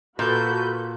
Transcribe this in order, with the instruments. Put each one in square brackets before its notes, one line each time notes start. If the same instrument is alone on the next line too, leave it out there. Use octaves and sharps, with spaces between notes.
[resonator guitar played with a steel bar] A#2 [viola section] F#4 A4 B4 [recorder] G6